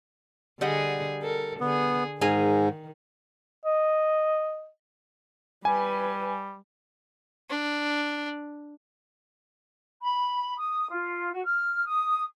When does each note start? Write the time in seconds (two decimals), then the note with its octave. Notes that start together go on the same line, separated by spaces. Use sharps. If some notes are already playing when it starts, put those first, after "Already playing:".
0.61 D3 G3 G#4 D#5 F#5
1.23 A4 A#4
1.61 D3 B3 G#4
2.21 G#2 D#3 G#4 A#4 G#5
3.65 D#5
5.65 G3 B4 G#5
7.50 D4
10.02 B5
10.58 D#6
10.92 F4
11.33 F#4
11.45 F6
11.86 D#6